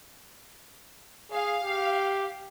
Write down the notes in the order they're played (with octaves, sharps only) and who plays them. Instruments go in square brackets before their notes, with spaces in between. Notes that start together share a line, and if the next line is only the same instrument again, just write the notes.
[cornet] G#4 [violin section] F5
[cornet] G4